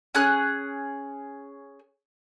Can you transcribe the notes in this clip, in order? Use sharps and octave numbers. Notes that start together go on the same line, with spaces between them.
C#4 G#4 F#6